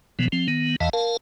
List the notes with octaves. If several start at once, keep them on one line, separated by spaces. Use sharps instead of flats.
B2 E3 F3 B3
F3 C4
D#3 B3
E2 E3 D#5 F5 A5
A#4 F5 A5